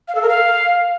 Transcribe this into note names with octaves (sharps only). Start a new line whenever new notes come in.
F5
A4
A#4
F5